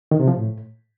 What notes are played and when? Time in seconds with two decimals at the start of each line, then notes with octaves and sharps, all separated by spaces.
0.11 D#3
0.20 C3
0.28 F3
0.36 A2